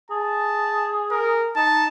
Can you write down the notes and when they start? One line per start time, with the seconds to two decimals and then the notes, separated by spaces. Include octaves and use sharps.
0.11 G#4 A5
1.11 A#4
1.56 D#4 A5